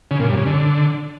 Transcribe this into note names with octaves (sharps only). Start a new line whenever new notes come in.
C#3
A#2
G2
C#3
D3